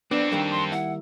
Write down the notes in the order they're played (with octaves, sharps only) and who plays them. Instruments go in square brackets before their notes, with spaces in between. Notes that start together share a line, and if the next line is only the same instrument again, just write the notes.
[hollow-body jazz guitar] B3 [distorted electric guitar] C4 A4 [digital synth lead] D4 [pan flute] D5
[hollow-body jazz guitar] D#3 G3 A#3 [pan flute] G5
[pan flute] C6
[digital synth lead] E4 [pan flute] F#5